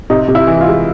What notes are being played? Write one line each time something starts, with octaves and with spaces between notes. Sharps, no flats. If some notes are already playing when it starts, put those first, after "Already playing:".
C3 D#4
C3
E4
E3
F4
G#3